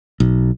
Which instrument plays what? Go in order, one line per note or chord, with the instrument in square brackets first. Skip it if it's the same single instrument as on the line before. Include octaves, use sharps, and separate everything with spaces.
[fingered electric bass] B1